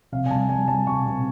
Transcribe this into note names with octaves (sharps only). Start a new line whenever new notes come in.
C3 F5
G#5
G3 A5
G3 G#5
G3 A5
C3 C#6
C3